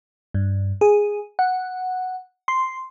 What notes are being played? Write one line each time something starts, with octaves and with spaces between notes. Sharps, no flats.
G2
G#4
F#5
C6